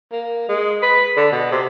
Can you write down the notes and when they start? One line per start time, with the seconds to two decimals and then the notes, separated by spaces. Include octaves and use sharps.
0.12 A#3
0.48 G#3
0.82 B4
1.16 D3
1.32 B2
1.51 C3